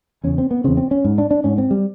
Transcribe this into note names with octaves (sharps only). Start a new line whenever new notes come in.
E2 C#3 C#4
C4
B3
E2 C#3 C4
C4
C#4
G#2
D4
D4
G#2 C#4
C4
G3